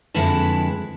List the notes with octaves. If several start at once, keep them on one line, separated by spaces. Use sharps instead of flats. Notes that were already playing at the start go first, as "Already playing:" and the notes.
F2 D3 G#3 E4 B4 A5